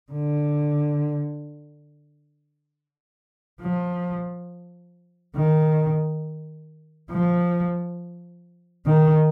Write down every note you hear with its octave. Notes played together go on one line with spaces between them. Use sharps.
D3
F3
D#3
F3
D#3